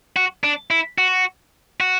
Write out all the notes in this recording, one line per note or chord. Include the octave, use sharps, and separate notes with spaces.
F#4
D4
E4
F#4
F#4